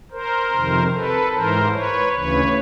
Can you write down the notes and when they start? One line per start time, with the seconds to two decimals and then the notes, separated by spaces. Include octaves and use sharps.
0.11 A#4 C5
0.52 F2 C3 D#3
0.92 A4 B4
1.32 G#2 E3 A#4 C5
1.72 B4 C#5
2.12 D2 C#3 E3 B4 C#5